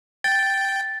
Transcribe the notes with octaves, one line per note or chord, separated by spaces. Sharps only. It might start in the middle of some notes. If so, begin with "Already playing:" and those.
G5 A6